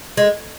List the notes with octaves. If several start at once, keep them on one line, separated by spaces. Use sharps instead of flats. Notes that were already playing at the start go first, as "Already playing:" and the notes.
G#3